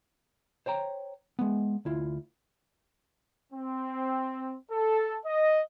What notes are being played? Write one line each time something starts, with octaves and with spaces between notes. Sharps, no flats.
C5 C#5 G5 A#5
G#3 B3
D2 E4 F4
C4
A4
D#5